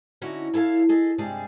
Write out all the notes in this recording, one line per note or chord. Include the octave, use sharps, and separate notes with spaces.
D3 C#4 D#4 E4 F#4
E4 A4 C#5 F5 A5
G#4 A4 D#5
G2 C3 G3 G#3 G#4 A5